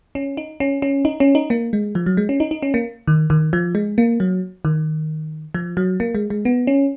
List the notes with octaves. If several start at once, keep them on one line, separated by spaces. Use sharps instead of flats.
C#4
D#4
C#4
C#4
D#4
C#4
D#4
A#3
G#3
F3
F#3
G#3
C#4
D#4
D#4
C#4
A#3
D#3
D#3
F3
G#3
A#3
F#3
D#3
F3
F#3
A#3
G#3
G#3
B3
C#4